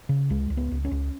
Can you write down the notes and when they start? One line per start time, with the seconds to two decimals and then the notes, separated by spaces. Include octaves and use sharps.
0.09 C#3
0.30 C#2 G#3
0.50 C#2
0.57 B3
0.71 C#2
0.85 C#4
0.91 C#2